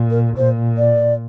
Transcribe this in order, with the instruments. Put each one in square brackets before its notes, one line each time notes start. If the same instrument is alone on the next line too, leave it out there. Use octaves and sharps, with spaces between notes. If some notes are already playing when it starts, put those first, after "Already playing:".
Already playing: [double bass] A#2
[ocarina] A#4
[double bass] A#2 [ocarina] C5
[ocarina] D5